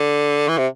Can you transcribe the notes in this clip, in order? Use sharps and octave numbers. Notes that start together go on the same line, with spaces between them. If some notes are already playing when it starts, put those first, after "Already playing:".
Already playing: D3
E3
C3